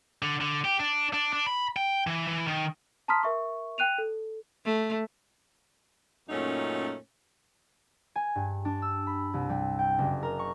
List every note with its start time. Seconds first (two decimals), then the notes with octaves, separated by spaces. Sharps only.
0.22 D3
0.41 D3
0.64 G4
0.79 D4
1.13 D4
1.33 D4
1.47 B5
1.76 G5
2.07 E3
2.27 E3
2.47 D#3
3.08 A5 A#5 C6 D#6 F6 B6
3.23 A#4 E5 C#6
3.78 G5 F#6 D#7 F7
3.98 A4
4.65 A3
6.29 F#2 A#2 A3 C#4 D#4
8.15 G#5
8.35 G2
8.65 D4
8.82 E6
9.07 B5
9.34 C2
9.49 G3
9.79 G5
9.98 F#1
10.23 A#4
10.39 C#6